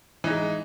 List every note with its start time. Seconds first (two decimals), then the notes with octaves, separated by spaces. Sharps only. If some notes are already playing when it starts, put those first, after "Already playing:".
0.24 E3
0.27 D#4
0.30 G#3